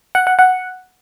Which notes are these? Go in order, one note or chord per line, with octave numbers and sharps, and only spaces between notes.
F#5
F#5
F#5